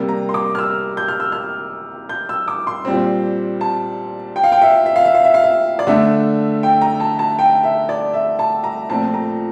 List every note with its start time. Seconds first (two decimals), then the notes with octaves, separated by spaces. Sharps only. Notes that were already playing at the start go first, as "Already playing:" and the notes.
Already playing: C3 G3 A#3
0.08 A#5
0.29 C6
0.34 D6
0.55 F6
0.59 E6
0.97 G6
1.08 F6
1.20 E6
1.32 F6
2.09 G6
2.29 E6
2.48 D6
2.67 C6
2.85 A#2 G3 C4
3.61 A5
4.36 G5
4.44 F5
4.52 G5
4.62 E5
4.86 E5
4.96 F5
5.05 E5
5.14 F5
5.24 E5
5.34 F5
5.44 E5
5.79 D5
5.87 D3 A3 D4 E5
6.63 G5
6.81 A#5
7.00 A5
7.19 A5
7.39 G5
7.63 E5
7.89 D5
8.14 E5
8.39 A5
8.64 A#5
8.89 A#2 F3 A3 C4 A5
9.14 A#5